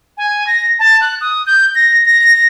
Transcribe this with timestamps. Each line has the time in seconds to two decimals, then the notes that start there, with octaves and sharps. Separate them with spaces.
0.18 G#5
0.47 A#6
0.79 A5
1.01 F#6
1.21 D#6
1.47 G6
1.75 A#6
2.05 A#6